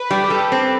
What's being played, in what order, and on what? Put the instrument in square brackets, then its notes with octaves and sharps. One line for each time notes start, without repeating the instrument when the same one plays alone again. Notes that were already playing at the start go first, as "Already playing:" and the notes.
Already playing: [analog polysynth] B4
[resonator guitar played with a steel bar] G3
[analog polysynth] G4
[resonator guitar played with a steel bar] G3 [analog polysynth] A4
[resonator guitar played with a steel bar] C4